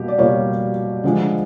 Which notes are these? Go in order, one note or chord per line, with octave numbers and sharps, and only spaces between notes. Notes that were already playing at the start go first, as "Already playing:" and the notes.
Already playing: B2 G3 A#3 G4
D5
B2 G3 A#3 C#5
D3 F3 G#3